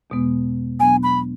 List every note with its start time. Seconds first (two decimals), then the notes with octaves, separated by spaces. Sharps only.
0.10 E2 B2 G#3 B3
0.79 B2 F#3 B3 D4 G#5
1.03 B5